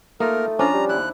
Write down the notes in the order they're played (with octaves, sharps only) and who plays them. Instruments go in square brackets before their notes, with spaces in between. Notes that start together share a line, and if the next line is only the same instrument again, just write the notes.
[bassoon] A3 [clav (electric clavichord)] A#3 [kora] D#4 F4 [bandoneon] A#4
[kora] F3 D4 F4 [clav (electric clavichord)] C#4 [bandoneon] A#5
[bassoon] G3
[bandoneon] D#2 F#6 [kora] E4